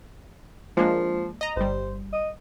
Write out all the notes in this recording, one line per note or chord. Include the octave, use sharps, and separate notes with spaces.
F3 G#3 A#3 D4
D#5 A#5
G1 G3 C5
D#5